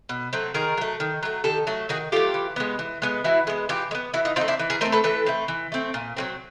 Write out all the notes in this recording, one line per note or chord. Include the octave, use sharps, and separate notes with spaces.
B2
F#3 A3 C4
D#3 G#4 A#4
F#3 A3
D#3
F#3 A3
D#3 G4 A4
F#3 A3
D#3 F#4 G#4
F#3 A3 F4 G4
E3
G#3 B3
E3
G#3 B3
E3 E4 F#4
G#3 B3
E3 F4 G4
G#3
B3
E3 E4 F#4
D#4 F4
C4 D#4 F4
A3
D4 E4
E3
G#4 A#4
A3 C4 A#4 C5
A4 B4
E3 A4 B4
A3 C4
E3
A3 C4
A#2
F#3 A3 C4